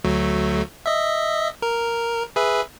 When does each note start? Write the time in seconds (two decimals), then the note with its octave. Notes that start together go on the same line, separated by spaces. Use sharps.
0.04 D2 F#3 A3
0.86 D#5 E5
1.62 A#4
2.36 G#4 B4 E5